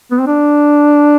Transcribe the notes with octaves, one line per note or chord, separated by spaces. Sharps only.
B3
C4
D4